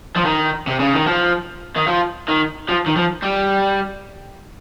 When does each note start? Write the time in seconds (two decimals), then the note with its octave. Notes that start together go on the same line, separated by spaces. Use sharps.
0.16 F3
0.25 D#3
0.67 C3
0.80 C#3
0.94 D#3
1.07 F3
1.76 D#3
1.88 F3
2.28 D#3
2.69 F3
2.86 D#3
2.96 F3
3.23 G3